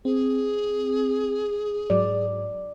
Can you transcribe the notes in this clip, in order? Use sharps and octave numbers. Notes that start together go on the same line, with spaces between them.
C4 G#4
G#2 F#3 D5